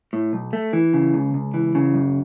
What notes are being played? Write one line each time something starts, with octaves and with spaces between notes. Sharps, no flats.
A2
B1
A3
E3
C#3
C#2
C#2
E3
C#3
F#2